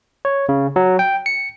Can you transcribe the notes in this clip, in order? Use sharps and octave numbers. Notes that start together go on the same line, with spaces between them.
C#5
C#3
F#3
G5
C#7